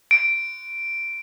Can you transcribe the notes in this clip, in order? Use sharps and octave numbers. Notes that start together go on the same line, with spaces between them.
D7